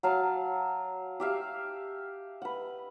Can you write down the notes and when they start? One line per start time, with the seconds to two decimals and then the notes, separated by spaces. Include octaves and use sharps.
0.03 F#3 F5 A5
1.20 G4 E5 F5
2.42 B4 F#5